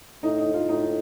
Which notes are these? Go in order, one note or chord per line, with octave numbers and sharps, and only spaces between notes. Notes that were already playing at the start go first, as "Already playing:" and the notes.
A2 D#4
D#4
F4
A2 D#4